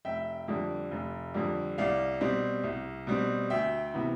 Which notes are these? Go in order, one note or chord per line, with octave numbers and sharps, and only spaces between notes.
F1 E5 G5
F2 D3 G3
F1
F2 D3 G3
C2 D5 F5
B2 G3 C4
C2
B2 G3 C4
D2 E5 G5
C3 E3 B3